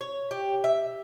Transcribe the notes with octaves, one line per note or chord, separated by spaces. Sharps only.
C#5
G4
E5